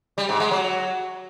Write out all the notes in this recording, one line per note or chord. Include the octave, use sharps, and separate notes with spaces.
G3
G#2
G#3
F#3